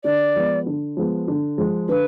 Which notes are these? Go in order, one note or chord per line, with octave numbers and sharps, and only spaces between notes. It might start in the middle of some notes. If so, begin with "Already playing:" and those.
D3 D5
F3 G#3 B3
D3
F3 G#3 B3
D3
F3 G#3
D3 B4